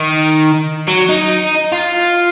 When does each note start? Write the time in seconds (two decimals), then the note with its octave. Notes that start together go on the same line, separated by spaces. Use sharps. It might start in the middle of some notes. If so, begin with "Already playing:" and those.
Already playing: D#3
0.88 F#3
1.09 D#4
1.72 F4